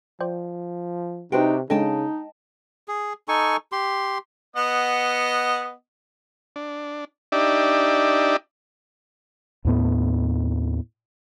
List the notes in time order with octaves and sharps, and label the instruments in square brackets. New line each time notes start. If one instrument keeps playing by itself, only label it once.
[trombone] F3 [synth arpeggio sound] C5 D5 G5
[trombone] C3 [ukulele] D4 F#4 G5 [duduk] D#4 [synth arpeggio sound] G4 B4 C5
[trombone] C#3 [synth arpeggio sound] G#3 D4 A4 [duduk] D#4 [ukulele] D#5 G5 A5
[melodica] G#4
D#4 A4 G#5 C#6
G4 C6
[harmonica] B3 D#5 F#5
[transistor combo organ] D4
D4 D#4 G4 D5 E5
[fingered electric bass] D#2 A2 B3